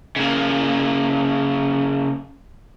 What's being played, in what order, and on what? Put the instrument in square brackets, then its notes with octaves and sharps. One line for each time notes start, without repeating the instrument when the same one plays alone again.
[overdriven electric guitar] C#3 A#3